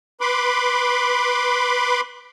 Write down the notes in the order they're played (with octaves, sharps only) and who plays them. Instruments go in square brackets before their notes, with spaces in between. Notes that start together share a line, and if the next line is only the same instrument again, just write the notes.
[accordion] B4 B5 C6 D6